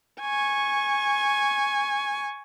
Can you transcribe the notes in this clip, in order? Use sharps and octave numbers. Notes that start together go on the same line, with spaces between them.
G#5 C#6